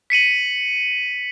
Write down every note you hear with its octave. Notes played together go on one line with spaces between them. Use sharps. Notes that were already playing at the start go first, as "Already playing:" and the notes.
B6 C#7 D#7 F#7